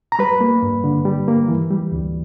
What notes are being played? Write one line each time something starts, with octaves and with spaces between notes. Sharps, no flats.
A#5
G3 B4 B5
A#3
G2
D3
G3
A#3
E3
G3
D2